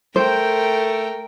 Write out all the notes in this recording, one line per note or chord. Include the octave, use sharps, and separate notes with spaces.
A3 A#4 C5 G5